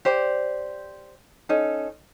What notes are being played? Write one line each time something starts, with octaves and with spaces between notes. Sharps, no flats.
G4 C5 D5
C#4 D#4 A4